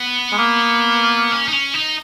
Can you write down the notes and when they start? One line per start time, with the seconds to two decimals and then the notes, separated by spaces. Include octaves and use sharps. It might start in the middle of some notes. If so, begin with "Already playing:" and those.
Already playing: B3
0.32 G#3
0.38 A#3
1.32 C#4
1.48 D#4
1.53 C#4
1.74 D#4